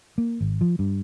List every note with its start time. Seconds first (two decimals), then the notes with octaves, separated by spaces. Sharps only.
0.18 A#3
0.41 G#1
0.61 F3
0.79 G2